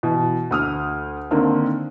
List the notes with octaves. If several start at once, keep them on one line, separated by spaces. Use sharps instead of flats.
B2 E3
D2 D#6 F6
D3 D#3 A#3 C4